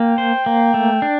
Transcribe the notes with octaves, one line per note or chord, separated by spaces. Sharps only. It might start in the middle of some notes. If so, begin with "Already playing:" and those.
Already playing: A#3 G5
C5
A#3
A3
D4